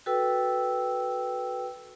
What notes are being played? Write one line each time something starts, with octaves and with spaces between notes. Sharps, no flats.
F#4 A4 B4 G5 E6